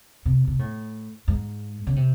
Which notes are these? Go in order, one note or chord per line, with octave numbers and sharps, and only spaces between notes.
C3
C3
A2
G#2
C#3
C3